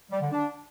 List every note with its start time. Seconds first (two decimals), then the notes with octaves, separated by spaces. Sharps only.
0.11 G3
0.21 D3
0.31 D4